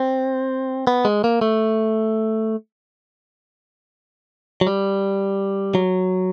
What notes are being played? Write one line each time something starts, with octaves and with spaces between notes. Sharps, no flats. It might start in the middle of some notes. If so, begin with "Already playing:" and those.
Already playing: C4
B3
G#3
A#3
A3
F#3
G3
F#3